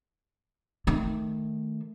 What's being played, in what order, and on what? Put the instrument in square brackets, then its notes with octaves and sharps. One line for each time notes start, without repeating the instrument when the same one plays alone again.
[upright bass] D#3 A3